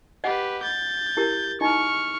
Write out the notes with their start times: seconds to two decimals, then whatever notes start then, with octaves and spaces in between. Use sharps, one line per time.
0.24 G4 B4 D#5 F#5
0.63 G6 A6
1.17 E4 G4 A#4
1.61 D#4 E4 D#5 C#6 F6